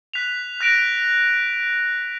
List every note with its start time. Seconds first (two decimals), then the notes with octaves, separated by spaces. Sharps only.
0.14 F#6 B6 F7
0.60 F#6 A#6 D7 F7